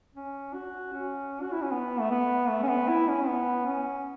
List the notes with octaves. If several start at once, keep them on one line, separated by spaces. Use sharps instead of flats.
C#4
F#4
C#4
F#4
E4
C#4
B3
A3
B3
A3
C#4
B3
E4
C#4
B3
C#4